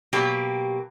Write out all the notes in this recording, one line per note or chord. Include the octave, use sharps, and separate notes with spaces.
B2 F#3 A#3 G4